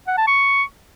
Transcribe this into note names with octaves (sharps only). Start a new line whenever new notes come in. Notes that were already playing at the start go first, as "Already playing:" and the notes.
F#5
A5
C#6